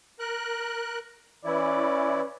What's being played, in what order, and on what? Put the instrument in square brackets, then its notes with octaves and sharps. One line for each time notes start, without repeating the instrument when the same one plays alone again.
[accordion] A#4 F#6
[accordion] E3 E4 [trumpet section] C#4 B4 D5